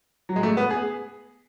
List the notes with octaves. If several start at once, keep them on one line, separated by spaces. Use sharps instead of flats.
F#3
G#3
A3
B3
G#4